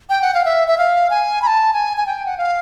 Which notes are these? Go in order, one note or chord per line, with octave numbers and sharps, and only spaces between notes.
G5
F#5
F5
E5
E5
F5
G#5
B5
A5
G#5
G#5
G5
F#5
F5